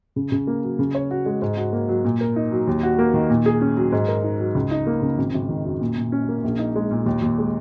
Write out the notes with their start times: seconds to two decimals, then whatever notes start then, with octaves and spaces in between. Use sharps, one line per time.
0.16 C#3
0.32 C#3
0.47 A#3
0.63 F#3
0.79 C#3
0.95 C#5
1.11 F#4
1.26 G#3
1.42 G#2
1.57 F#4
1.73 A#3
1.89 F#3
2.05 A#2
2.21 A#4
2.36 D#4
2.52 F#3
2.67 D#2
2.83 F#4
2.99 A#3
3.14 D#3
3.30 A#2
3.46 G#4
3.61 C#4
3.77 F#3
3.92 G#2
4.08 A#4
4.24 D#4
4.40 F#3
4.55 C#2
4.71 D#4
4.87 A#3
5.02 C#3
5.18 G#1
5.34 G#1
5.49 D#3
5.65 F#2
5.81 A#2
5.97 A#2
6.12 C#4
6.29 A#3
6.44 A#1
6.59 D#4
6.76 G#3
6.91 A#2
7.06 D#2
7.22 D#2
7.38 G#3